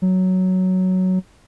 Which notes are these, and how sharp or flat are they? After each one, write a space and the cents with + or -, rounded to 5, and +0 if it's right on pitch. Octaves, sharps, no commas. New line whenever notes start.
F#3 +5